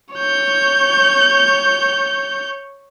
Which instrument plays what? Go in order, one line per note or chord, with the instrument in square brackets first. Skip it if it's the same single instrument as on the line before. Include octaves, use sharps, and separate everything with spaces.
[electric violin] C#5 G6